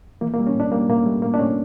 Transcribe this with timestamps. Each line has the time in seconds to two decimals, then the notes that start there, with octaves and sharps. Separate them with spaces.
0.21 E3 A#3
0.34 A#3
0.38 G3
0.47 C#4
0.55 A2 D4
0.72 G3 A#3
0.88 A2 A#3
1.06 G3 A3
1.22 A2 A#3
1.34 D4
1.39 A2 C#4